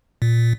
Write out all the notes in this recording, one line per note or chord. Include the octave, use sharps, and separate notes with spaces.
A#2